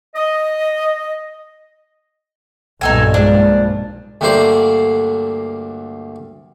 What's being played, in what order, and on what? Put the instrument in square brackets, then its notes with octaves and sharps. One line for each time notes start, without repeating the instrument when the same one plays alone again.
[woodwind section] D#5
[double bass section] B1 G2 A#2 [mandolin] D#4 A4 G#5
[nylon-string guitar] F3 G#3 [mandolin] D4
[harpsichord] D2 G2 D3 A#3 C5 D5